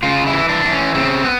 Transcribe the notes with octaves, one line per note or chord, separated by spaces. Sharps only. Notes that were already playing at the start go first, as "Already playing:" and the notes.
C#3 F4
E4
E3
D4
E3
C#4
C#3 C4
B3